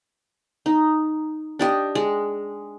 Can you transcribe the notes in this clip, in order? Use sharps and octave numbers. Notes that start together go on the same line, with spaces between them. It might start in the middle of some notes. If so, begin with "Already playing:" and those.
D#4
D4 G4 D#5
G#3